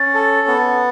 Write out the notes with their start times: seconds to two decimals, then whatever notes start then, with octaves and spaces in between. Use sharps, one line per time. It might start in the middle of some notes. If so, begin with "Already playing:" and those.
Already playing: C#4 A6
0.14 A4
0.48 B3